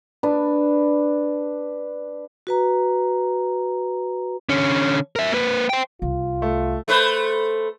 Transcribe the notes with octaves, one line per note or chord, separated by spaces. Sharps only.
D4 B4
F#4 B4 A#5
D3 C#4
A#4 E5
A#3 B4
C5 G5
C2 F4
A3
A3 B4 C5